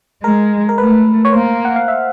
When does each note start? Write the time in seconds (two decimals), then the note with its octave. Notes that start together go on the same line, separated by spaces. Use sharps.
0.23 G#3 A#4
0.69 A#4
0.78 A3 B4
1.25 C#5
1.33 A#3 C5
1.65 F#5
1.76 F5
1.88 E5